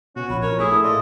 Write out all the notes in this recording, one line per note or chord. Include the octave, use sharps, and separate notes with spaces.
B2 C#4 F#4
A#1 B5
A#4 C#5
A2 E4 G#4 D#6
A3
F4 D5 D#5